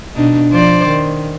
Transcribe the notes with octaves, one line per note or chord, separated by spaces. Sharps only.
B2 D4 D#4
F3 C5 D5
D#3